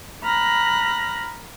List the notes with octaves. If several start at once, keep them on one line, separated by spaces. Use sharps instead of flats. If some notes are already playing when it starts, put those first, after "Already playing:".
A#5 B5 F6 F#6 A#6